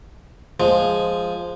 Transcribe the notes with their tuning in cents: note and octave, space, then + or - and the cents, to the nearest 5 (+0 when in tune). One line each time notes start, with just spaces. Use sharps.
F3 +0 G#3 +0